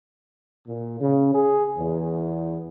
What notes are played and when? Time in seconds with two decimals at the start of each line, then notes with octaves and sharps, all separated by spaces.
0.66 A#2
0.99 C#3
1.33 G#4
1.77 E2